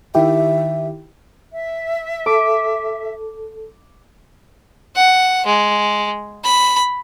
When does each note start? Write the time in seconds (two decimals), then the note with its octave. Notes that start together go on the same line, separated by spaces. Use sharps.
0.15 D#3 E4 G4 E5
1.52 E5
2.26 A4 D6
4.96 F#5
5.46 G#3
6.44 B5